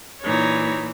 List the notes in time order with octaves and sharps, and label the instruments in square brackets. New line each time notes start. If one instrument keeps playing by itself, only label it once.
[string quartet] A#2 E3 [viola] D#4 C#5